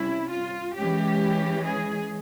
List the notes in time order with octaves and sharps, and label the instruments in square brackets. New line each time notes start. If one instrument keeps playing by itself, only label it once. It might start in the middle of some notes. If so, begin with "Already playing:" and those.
Already playing: [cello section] C3 G3 C#4 E4
F4
E3 G#3 C#4 G4
G#4